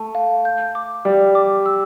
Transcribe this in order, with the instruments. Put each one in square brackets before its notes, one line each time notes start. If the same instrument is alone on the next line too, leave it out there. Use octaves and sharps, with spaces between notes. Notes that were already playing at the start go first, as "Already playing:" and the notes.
Already playing: [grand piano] A3 [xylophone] A5
[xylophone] F5
G6
D6
[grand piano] G3 [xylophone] D5
[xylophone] D6
E6